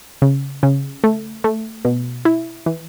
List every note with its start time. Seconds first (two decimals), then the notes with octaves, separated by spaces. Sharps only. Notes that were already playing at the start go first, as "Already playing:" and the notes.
0.22 C#3
0.63 C#3
1.04 A3
1.44 A3
1.85 B2
2.25 E4
2.66 E3